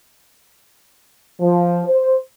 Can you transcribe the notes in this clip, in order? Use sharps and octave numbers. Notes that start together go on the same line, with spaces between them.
F3
C5